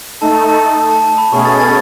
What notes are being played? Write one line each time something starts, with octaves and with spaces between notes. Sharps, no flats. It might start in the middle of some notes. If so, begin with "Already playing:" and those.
A3 D#4 A4 A5
A5
A5
A5
A5
A5
B5
B2 A3 C#4 G#4 C#6
A6
A6